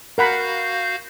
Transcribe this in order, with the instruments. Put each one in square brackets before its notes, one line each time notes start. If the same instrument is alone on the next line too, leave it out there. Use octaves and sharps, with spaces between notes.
[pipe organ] F#4 F5 G6 [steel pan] A#4 F#5 B5